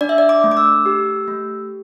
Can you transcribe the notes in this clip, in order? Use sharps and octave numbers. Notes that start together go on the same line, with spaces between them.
D4 D5
E5
D5
D6
A3
D6
E6
G4
A3